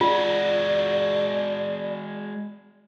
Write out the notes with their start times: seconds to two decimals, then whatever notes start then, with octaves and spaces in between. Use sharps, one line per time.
0.01 G#3 F4 F#4 D5